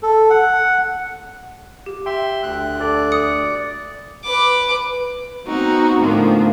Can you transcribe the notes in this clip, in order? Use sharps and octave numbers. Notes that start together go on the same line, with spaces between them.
A4
F#5
G4
E5 G5 C6
D2 F#6
A4 D5
D#6 C#7
B4 D6
B3 C4 D#4 F#4
A2 D3 D#3 F3 A#3 B3